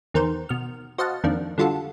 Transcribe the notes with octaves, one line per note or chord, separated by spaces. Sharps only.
E2 D#3 A#4 C5
B2 F6
F#4 C5 D#5 F5 F#5 A5
F2 D#3 A#3 D4
D3 G3 F4 F#4 A4